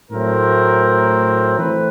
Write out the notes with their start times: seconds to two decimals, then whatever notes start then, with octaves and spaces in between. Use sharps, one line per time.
0.11 A2 F#3 A3 C4 A#4
1.58 E3 A3 C4 B4